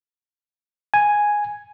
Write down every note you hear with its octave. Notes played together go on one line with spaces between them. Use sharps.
G#5